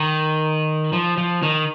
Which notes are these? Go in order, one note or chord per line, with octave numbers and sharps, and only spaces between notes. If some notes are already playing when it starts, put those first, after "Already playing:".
Already playing: D#3
F3
F3
D#3